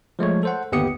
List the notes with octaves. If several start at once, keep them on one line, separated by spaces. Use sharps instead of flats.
F3 G#3 A3 C#5
A4 C5 F#5
G1 D#2 B3 G4 D#6 C#7